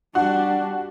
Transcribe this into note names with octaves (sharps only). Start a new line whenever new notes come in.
G3 D4 F#4